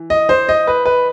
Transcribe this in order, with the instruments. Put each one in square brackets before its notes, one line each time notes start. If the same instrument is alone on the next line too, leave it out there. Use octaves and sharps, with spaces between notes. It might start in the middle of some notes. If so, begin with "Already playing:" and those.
Already playing: [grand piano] E3
D#5
C5
D#5
B4
B4